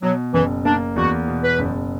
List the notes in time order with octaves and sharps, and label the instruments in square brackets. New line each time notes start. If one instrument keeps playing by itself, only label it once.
[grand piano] B2 [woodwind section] F#3
[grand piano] F#1 [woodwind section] E3
[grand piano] A#3 [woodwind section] D4
[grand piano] E2 [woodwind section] F#4
[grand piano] B2
[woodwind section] B4
[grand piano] F#1